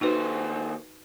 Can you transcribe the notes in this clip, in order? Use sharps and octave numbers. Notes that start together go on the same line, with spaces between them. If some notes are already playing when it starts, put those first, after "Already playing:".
D#2 D#4 F#4 B4 C5